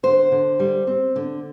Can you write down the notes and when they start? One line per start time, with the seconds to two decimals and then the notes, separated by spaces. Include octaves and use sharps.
0.03 D3 C5
0.32 D3
0.60 G3
0.87 C4
1.16 D3